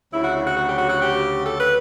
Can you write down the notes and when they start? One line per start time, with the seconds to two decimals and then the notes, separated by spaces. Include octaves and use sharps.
0.13 D2 C#3 F#3 E4
0.24 F#4
0.35 E4
0.46 F#4
0.57 F#4
0.68 G4
0.78 F#4
0.89 F#4
1.01 G4
1.44 A4
1.60 B4